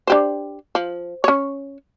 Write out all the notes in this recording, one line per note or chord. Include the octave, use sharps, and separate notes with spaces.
D4 G4 C5
F3
C#4 C#5